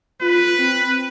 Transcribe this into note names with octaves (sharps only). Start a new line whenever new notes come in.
F4 B4
C4